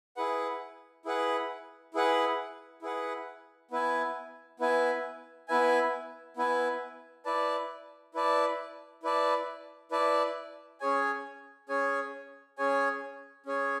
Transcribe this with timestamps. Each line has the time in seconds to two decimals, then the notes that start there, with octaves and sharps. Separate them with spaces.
0.17 E4 G#4 B4 F#5
1.05 E4 G#4 B4 F#5
1.94 E4 G#4 B4 F#5
2.82 E4 G#4 B4 F#5
3.71 B3 E4 B4 E5 G#5
4.60 B3 E4 B4 E5 G#5
5.48 B3 E4 B4 E5 G#5
6.37 B3 E4 B4 E5 G#5
7.25 E4 B4 D5 A5
8.14 E4 B4 D5 A5
9.03 E4 B4 D5 A5
9.91 E4 B4 D5 A5
10.80 C#4 G#4 C#5 G#5
11.69 C#4 G#4 C#5 G#5
12.58 C#4 G#4 C#5 G#5
13.46 C#4 G#4 C#5 G#5